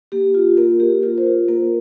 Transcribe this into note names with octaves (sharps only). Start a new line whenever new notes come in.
A#3 G4
F4
A#3 A#4
A#3 G4
F4 A#4
C5
F4
A#3 A#4